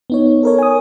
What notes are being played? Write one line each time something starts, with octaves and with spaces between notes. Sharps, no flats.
B3 D#4 C#5
A4 A#4 C#5
G#5 D#6